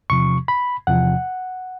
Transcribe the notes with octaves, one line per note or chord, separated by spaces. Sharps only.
E2 C3 F3 C#6
B5
E2 C3 F3 F#5